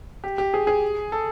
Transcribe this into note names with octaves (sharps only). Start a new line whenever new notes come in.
G4
G4
G#4
G#4
A4